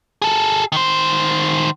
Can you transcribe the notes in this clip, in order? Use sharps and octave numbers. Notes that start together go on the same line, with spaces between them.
G#4 A4
D#3 C5